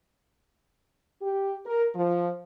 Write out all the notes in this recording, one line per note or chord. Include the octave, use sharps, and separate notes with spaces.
G4
A#4
F3